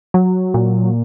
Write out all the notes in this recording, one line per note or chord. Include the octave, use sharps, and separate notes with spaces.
F#3
A#2